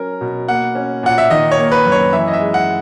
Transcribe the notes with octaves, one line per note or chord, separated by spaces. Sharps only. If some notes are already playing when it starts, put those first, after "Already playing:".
Already playing: F#3 C#4 A#4
B2
A#3 F#5
C#4
A#2 F#5
E5
D#3 D#5
C#5
A#3
B4
F#2
C#5
E3 E5
D#5
E5
G#3
F#5